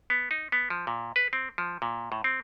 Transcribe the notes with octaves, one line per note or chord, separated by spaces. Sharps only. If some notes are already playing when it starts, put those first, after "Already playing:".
B3
D#4
B3
F3
A#2
B4
C4
F3
A#2
A2
C4